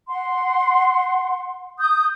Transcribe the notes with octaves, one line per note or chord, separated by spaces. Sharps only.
F#5 C6
D#6 G6